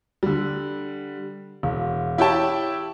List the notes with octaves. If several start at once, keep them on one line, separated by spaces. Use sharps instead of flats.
D3 G3
E1
E4 G4 C#5 G5 A5